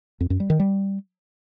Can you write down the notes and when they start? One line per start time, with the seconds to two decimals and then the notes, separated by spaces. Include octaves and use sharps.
0.20 F2
0.30 F#2
0.40 G3
0.50 D#3
0.60 G3